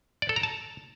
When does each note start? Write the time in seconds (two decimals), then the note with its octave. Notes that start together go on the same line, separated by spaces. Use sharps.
0.22 D5
0.29 A4
0.36 A#5
0.43 A5